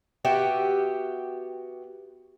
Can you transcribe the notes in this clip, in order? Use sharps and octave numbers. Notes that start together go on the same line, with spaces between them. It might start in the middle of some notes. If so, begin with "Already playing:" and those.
B3 F#4 G4 E5